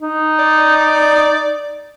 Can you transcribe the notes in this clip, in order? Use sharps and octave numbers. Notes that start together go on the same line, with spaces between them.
D#4
D5